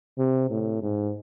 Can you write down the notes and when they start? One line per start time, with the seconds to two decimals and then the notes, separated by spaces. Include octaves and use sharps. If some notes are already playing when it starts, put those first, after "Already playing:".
0.18 C3
0.50 A2
0.82 G#2